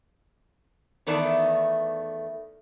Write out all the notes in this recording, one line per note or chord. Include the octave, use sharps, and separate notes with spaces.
E2 D#3 A3 B3 D5 A5